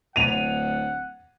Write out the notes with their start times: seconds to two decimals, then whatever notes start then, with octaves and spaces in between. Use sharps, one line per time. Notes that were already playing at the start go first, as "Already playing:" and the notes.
0.16 D1 F#5 D#7 F7